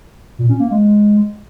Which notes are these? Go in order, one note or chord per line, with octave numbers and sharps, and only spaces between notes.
A#2
C#4
A#3
G#3